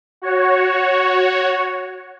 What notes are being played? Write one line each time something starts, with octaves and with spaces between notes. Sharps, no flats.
F#4 C#5